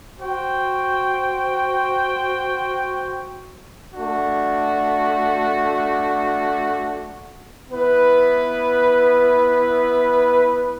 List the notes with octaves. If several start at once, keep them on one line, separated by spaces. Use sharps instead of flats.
F#4 C5 G5
A3 D4 F#4
B3 E4 B4